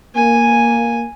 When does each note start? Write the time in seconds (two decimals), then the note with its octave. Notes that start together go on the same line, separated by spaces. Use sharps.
0.15 A#3 G#5